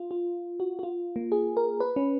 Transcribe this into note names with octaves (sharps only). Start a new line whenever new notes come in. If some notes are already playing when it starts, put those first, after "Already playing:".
Already playing: F4
F4
F#4
F#4
F4
A#3
G#4
A#4
B4
C#4